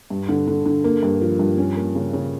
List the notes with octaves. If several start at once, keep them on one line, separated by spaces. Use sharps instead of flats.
G2
D3
D3
D3
A#3
G2
F3
G2
C#4
A#3
C#3
C#3